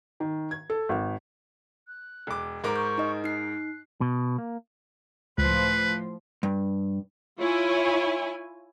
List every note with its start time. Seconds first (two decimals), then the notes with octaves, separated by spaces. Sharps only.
0.20 D#3
0.51 G#6
0.70 A4
0.89 G#1
1.87 F#6
2.27 E1 D6
2.64 G#2 A#4 D6
2.76 C#6 G6
2.98 D#4 D#5
3.24 D#4 F#6 C7
4.01 B2
4.38 A#3
5.38 C#2 A2 F3 B4 C5
6.43 G2
7.39 E4 F4 C#5 G#5